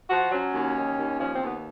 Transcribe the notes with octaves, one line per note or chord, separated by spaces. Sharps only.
F3 F#4
F#3 C#4
D#2
D#3
D#2
F3 C#4
C4
D#2 B3